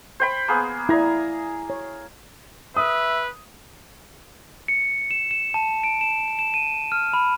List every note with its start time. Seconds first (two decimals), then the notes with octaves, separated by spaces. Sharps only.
0.20 C5 G5 B5
0.48 A#3 B3 G#4
0.89 E4 D5 G#5 A#5
1.70 C#5
2.77 B4 E5 D#6
4.68 C#7
5.11 E7
5.31 E7
5.54 A5
5.84 D7
6.01 E7
6.39 E7
6.54 D#7
6.92 F6
7.13 B5